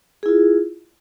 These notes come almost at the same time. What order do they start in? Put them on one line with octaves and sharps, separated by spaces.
G#4 E4 F4